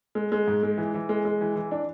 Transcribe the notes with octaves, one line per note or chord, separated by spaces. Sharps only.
G#3
G#3
G#2
G#3
E3
E3
G#3
G#3
E3
E3
D4